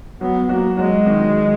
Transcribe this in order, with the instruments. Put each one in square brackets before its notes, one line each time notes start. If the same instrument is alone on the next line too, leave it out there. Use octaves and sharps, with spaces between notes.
[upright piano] F#3 F#4 [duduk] B3
[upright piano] F#3 F#4 [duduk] A#3
[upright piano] F#3 F#4 [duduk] G#3
[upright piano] D#3 D#4